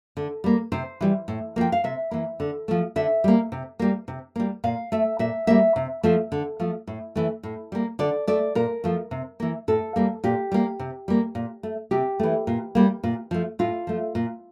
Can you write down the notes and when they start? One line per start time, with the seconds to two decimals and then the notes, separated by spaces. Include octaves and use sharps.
0.17 D3
0.44 G3 A#3
0.72 C3 C5
1.01 E3 G3
1.28 A2
1.56 F3 A#3 G5
1.72 F5
1.84 C3 E5
2.11 E3 A#3
2.40 D3
2.68 F3 A3
2.96 D3 E5
3.24 G3 A#3
3.52 C3
3.79 G3 A#3
4.08 C3
4.36 G3 A#3
4.64 A#2 F5
4.92 A3 E5
5.19 A#2 E5
5.47 G3 A#3 E5
5.76 C3
6.03 F3 A3
6.32 D3
6.60 F3 A3
6.87 A2
7.16 E3 A3
7.43 A2
7.72 G3 A#3
7.99 D3 D5
8.27 A3 D5
8.55 A#2 A#4
8.84 F3 A3
9.11 C3
9.40 E3 A#3
9.68 A2 A4
9.96 G3 A#3
10.24 A#2 G4
10.52 G3 A#3
10.79 C3
11.08 G3 A#3
11.35 A#2
11.63 A3
11.91 C3 G4
12.19 E3 A3
12.47 A#2
12.75 G3 A#3
13.04 A#2
13.31 F3 A3
13.59 A2 F4
13.87 F3 A3
14.15 A#2